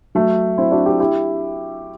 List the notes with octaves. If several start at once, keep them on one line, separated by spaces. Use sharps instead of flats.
F#3 A3
C4 E4
D4 F#4
E4 G4
E4 G4